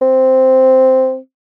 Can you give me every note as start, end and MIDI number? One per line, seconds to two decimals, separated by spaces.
0.02 1.18 60